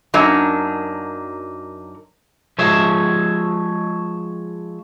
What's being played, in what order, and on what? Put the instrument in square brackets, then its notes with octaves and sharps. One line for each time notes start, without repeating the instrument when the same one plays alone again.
[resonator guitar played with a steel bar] F#2 F#3 A#3 D4 D#4
[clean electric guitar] F3 G#3 C#5 E5